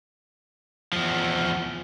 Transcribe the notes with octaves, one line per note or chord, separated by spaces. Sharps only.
E2 F3